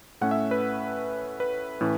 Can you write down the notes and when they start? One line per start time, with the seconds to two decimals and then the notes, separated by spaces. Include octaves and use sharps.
0.21 A2 A3 C#4 F#5
0.31 E5
0.51 B4
1.40 B4
1.81 A2 E3 C#4